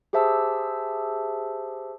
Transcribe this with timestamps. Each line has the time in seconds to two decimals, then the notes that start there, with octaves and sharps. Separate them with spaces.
0.13 G4 G#4 C5 E5 A5 E6